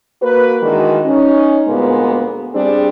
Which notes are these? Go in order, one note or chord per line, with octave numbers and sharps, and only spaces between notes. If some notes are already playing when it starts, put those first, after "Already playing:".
A#3 F#4 A#4 B4
D#3 E3 G#3 D4 F#4 A#4
C#4 D#4
D2 A#2 G#3 A#3 B3 B4
G3 C4 D4 G#4